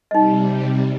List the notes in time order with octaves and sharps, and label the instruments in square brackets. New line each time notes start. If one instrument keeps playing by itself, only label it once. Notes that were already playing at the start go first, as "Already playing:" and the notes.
[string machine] C3 G3 [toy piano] D#4 D#5